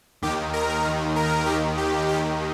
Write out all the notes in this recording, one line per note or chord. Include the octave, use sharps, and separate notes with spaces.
D#2 D#3 G4
A#4
D#2 D#3
A#4
D#2 D#3 G4
G4
D#2 D#3 G4